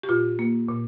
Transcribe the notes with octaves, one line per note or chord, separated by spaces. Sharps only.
G4
A#2 F4
A#3
A#2